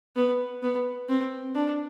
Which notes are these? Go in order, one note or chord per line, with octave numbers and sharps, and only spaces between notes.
B3
B3
C4
D4